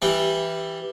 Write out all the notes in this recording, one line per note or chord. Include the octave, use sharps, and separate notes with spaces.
E3 G3